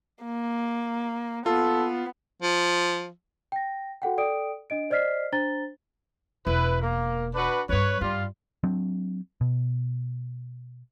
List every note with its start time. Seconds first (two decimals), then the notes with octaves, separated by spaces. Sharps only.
0.24 A#3
1.46 B3 F4 A4
2.42 F3
3.52 G5 A#6
4.02 F#4 A4 F#5 G5
4.18 A4 D5 G5 D#6 D7
4.70 D4 D#5 D7
4.90 C5 D5 D#5 F6 B6 C7
5.32 D4 C5 A#5 A6 G7
6.47 E1 E4 B4
6.82 A#3
7.34 D4 F#4 B4
7.69 G2 G3 B4 C#5
8.01 G2 G3 F4
8.64 F#3 C4 D4
9.41 B2